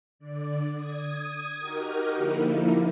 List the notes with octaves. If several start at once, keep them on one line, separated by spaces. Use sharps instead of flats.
D3 D5
D#6 G#6
D#4 F#4 G4 A#4
D3 F3 A#3 D#4 E4